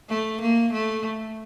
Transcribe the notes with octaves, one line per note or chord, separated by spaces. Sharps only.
A3
A#3
A3